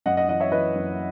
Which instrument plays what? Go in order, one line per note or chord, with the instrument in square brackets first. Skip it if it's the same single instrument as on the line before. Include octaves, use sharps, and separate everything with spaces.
[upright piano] F#2 D#5 F#5
D#5 F#5
E3 D#5 F#5
C#5 E5
E3 B4 D#5
F#2